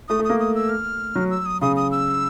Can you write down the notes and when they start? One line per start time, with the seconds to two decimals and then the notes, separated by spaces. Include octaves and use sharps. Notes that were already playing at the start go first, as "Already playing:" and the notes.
0.08 A3 D#6
0.19 A3
0.25 A#3 D#6
0.40 D#6
0.55 E6
0.69 F6
1.15 F#3
1.30 E6
1.46 D#6
1.61 C#3 D#6
1.76 D#6
1.91 E6